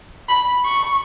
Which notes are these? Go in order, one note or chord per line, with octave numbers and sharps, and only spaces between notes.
B5
C#6